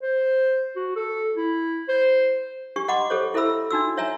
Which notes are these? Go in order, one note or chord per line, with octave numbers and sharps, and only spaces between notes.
C5
F#4
A4
E4
C5
D4 G4 C#6
D#5 F#5 B5 C6 D6
G4 A4 C5 C#5
E4 A4 C5 E5 B5 E6
D4 D#4 F#4 E6
C#5 E5 G#5 A#5